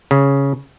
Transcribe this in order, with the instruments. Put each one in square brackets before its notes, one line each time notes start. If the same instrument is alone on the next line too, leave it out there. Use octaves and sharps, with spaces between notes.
[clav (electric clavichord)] C#3